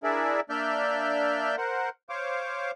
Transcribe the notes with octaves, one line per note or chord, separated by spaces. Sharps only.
D4 E4 G#4 A#4 D5 E5
A#3 D4 D5 E5 F6 G6
A#4 C5 F#5
C5 C#5 F5 D6